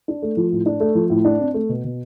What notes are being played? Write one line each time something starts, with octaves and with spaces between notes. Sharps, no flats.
D4
A3
F3
A2
D4
A3
F3
A2
D4
C4
A3
B2
B2